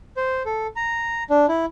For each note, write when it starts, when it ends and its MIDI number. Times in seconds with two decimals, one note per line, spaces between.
0.17 0.43 72
0.46 0.67 69
0.76 1.23 82
1.30 1.46 62
1.49 1.65 64